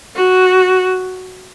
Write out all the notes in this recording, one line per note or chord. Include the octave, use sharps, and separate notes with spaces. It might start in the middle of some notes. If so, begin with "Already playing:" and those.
F#4